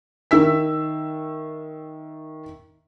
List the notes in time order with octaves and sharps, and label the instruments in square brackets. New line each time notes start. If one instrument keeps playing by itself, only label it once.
[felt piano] D#3 E5 E6 B6